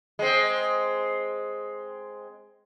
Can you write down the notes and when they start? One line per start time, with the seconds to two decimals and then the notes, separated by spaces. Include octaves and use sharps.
0.19 G#3 C4